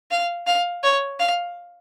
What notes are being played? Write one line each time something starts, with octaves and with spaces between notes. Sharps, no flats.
F5
F5
C#5
F5